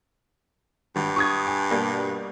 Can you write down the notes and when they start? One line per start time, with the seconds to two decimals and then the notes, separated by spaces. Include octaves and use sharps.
0.96 G#1 G2
1.16 C#6 D#6 G#6
1.47 G#5
1.71 B2 G3 A#3